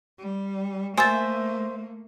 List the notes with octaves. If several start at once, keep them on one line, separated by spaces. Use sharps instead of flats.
G3
A3 A#3 C5 E5 G#5 A6